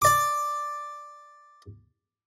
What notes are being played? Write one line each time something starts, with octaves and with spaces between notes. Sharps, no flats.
D5 D6